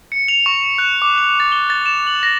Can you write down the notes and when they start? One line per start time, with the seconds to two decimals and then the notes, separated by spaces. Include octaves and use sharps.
0.12 C#7
0.28 F7
0.46 C#6
0.78 F#6
1.02 D6
1.18 F7
1.40 A6
1.52 G7
1.70 A6
1.86 E7
2.07 F#7
2.23 A#6